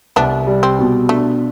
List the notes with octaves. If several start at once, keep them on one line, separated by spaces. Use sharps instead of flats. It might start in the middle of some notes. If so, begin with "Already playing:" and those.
C2 B3 D4
G3
C4
B2
A3 D4